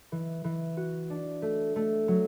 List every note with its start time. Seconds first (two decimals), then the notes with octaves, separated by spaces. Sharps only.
0.12 E3
0.44 E3
0.77 F#4
1.10 D4
1.42 A3
1.76 A3
2.08 F#3